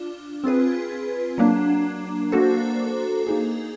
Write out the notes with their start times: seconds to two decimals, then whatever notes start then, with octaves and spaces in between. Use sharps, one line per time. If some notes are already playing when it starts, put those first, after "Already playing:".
Already playing: D4 F4
0.44 C4 F4 G#4 B4
1.38 F#3 A#3 D4
2.32 A#3 D4 F#4 A4 C5
3.27 A#3 D#4 G#4